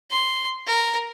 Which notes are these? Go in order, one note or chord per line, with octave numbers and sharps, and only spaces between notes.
C6
A#4